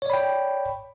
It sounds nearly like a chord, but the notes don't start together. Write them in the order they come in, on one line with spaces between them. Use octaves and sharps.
C#5 D5 B5 G5